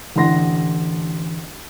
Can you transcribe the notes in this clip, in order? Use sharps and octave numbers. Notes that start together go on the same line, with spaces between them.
A1 D3 F#5 C6 A#6